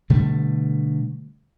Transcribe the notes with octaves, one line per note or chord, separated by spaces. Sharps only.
B2 D3 G3 A3